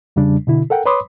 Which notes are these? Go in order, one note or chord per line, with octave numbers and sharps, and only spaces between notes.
E2 C#3 G3 D4
B2 D3 E4
A4 A#4 F#5 G5
B4 C#5 B5 C6 D6 D#6